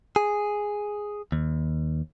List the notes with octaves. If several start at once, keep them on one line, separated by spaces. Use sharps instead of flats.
G#4
D#2